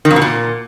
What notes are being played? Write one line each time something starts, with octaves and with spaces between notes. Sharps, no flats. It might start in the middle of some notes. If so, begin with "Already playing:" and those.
D#3
F2
B2
A#2